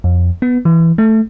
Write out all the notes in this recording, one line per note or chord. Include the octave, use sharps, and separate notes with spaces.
F2
B3
E3
A3